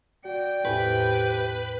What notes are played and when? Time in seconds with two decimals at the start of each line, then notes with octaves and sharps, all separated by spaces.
0.25 F#4 D5 G5
0.65 E2 A2 C3 G4 B4